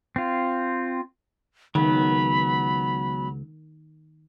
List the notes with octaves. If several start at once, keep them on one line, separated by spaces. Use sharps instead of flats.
C4 F4
C#2 D#3 F#3 B3 B5